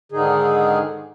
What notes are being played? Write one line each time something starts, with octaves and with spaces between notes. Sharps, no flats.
G#2 D3 D#3 D#4 G#4